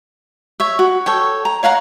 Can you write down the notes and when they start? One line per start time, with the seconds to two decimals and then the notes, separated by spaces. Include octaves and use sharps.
0.60 C#5 E5
0.79 F#4
1.06 A4 C#5 G5
1.45 A#5
1.63 C#5 F5 F#5 A#5